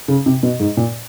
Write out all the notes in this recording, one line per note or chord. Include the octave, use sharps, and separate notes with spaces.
C#3
C3
B2
G#2
A#2